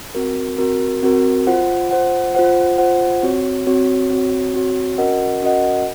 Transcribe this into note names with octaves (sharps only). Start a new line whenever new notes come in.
C4 F#4 A#4
C4 F#4 A#4
C4 F#4 A#4
F4 C5 F#5
F4 C5 F#5
F4 C5 F#5
F4 C5 F#5
C4 F#4 C#5
C4 F#4 C#5
C4 F#4 C#5
C4 F#4 C#5
C#4 F#4 A#4 D#5 F#5
C#4 F#4 A#4 D#5 F#5